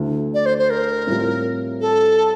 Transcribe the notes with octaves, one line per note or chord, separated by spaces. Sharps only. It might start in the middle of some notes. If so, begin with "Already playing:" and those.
Already playing: D2 D3 A3 E4
D5
C5
C5
A#4
A2 G3 C4 F4
A4